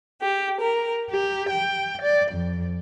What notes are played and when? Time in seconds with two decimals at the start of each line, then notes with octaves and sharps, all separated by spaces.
0.21 G4
0.59 A#4
1.09 G4
1.50 G5
2.01 D5
2.32 F2